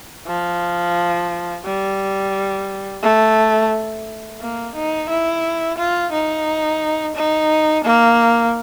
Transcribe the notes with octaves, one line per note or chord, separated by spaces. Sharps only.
F3
G3
A3
A#3
D#4
E4
F4
D#4
D#4
A#3